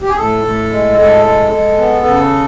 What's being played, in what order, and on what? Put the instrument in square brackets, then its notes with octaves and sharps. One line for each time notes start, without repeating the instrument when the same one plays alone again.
[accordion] G4
G#4
A2 A4
A2
G#3
A2 A4
G#3
G#3
B3
C#3